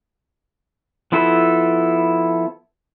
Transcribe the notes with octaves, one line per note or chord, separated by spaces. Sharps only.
F3 B3 E4 A4